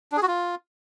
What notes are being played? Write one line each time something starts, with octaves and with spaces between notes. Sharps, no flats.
D4
G#4
F#4
F4